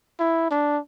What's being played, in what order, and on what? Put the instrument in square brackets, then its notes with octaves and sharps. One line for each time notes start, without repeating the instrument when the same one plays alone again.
[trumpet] E4
D4